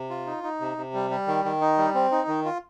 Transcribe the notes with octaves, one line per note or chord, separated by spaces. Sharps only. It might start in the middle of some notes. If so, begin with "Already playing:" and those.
Already playing: C3
F4
D#4
D#4
C3
C3
G3
G3
D#3
D#3
D#4
G3
C4
D#4
D#3
F4